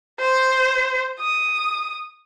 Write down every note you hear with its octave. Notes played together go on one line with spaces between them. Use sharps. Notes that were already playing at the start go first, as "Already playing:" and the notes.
C5
D#6